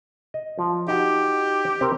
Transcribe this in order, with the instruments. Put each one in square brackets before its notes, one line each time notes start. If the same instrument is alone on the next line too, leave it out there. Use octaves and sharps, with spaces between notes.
[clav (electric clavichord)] D#5
F3
[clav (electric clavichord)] D#4 F#4 [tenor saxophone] G4
[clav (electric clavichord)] C4 A#4 G5